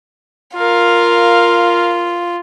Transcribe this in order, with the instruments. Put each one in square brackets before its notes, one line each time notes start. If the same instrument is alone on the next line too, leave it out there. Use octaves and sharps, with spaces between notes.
[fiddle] F4 [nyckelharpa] A#4 F5